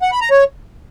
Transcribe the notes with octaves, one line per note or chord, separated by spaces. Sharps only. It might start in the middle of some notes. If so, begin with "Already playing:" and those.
F#5
B5
A#5
C#5